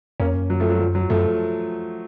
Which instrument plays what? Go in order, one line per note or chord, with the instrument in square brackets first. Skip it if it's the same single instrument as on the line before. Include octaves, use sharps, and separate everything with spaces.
[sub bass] F2 [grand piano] A#3 C#4
[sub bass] F#2
[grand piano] F#3
F3 A3
F#3
F3
F#3
[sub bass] F#2 [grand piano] F3 A3